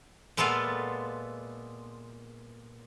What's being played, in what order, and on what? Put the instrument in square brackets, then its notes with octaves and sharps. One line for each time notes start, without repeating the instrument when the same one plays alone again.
[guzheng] A#2 G#3 B3 F4 A4 F5